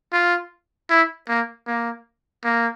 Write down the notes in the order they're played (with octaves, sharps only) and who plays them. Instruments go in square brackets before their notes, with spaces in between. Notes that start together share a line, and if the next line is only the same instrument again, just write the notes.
[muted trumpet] F4
E4
A#3
A#3
A#3